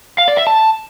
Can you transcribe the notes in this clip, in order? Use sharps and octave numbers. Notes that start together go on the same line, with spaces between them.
F5
D5
E5
A5